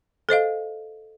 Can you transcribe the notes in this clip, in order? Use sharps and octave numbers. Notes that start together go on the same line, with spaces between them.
A4 C5 D#5 F5